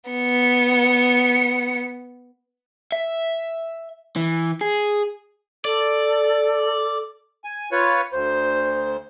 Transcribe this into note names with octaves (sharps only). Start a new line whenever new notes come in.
B3 C#7
E5
E3
G#4
A4 D5
G#5
F4 B4 C#5
D2 C5